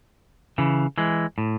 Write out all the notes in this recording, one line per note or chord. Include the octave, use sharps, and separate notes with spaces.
C#3 E3
E3 G#3
A2